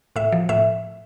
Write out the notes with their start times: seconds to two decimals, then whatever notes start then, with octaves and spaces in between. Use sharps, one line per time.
0.16 A2 E5
0.32 F3
0.49 A2 E5